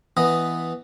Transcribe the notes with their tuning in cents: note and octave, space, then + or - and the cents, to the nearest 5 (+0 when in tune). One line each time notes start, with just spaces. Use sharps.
E3 +0 B3 +0 D#5 +0